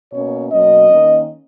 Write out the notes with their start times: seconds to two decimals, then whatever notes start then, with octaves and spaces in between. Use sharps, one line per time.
0.12 B2 A#3 C#4 C#5
0.50 B2 F#3 A#3 C#4 D#5
0.89 D#3 A#3 C#4